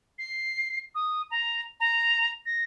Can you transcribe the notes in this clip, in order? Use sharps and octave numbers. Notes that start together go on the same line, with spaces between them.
C7
D#6
A#5
A#5
A#6